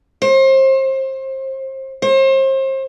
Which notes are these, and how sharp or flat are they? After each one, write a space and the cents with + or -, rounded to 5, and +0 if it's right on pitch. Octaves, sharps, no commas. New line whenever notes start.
C5 +30
C5 +35